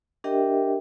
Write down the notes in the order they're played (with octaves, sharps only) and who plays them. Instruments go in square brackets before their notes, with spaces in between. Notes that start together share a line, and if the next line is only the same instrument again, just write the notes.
[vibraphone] D4 G4 A#4 D#5 E5 G5